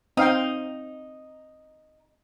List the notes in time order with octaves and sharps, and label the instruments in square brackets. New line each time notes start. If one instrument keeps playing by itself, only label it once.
[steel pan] C4 F5 G5 [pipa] D#4